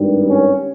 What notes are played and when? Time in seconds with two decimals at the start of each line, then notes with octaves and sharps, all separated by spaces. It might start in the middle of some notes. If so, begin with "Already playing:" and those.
Already playing: G#1 G2 D#3 G3
0.27 C#4